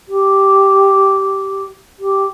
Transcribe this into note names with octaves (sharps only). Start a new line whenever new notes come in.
G4
G4